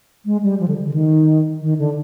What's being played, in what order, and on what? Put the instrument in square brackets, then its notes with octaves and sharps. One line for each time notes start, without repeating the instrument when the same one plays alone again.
[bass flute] G#3
G3
F3
D3
D3
D#3
D#3
D3